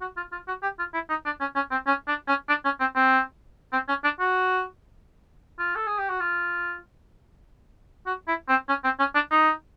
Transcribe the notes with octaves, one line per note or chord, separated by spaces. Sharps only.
F#4
F4
F4
F#4
G4
F4
E4
D#4
D4
C#4
C#4
C4
C#4
D4
C#4
D4
C#4
C4
C4
C4
C#4
D4
F#4
F4
A4
G#4
G4
F#4
F4
F#4
E4
C4
C#4
C4
C#4
D4
D#4